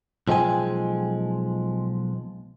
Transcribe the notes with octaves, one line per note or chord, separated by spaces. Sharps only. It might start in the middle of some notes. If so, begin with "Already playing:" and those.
B1 F3 G#3 G5 G#5